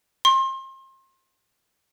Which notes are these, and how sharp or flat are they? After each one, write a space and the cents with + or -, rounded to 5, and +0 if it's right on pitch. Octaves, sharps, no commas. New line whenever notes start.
C6 +30